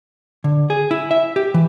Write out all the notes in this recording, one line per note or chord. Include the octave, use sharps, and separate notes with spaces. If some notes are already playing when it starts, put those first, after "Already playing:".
D3
G#4
E4
E5
G4
E3